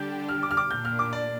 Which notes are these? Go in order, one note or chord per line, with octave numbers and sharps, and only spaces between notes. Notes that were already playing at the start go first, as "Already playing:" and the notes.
Already playing: D3 G3 D4 G4 G6
F6
D6
F6
D6
A#2 A#3 D4 G6
F6
D6
D5